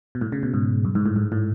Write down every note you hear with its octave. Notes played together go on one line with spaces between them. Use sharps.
B2
A2
C#3
B2
G#2
F#2
G#2
A2
G#2
A2